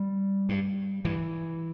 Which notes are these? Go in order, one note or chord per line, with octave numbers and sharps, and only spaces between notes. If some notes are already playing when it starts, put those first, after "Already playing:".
Already playing: G3
G2
G2 E3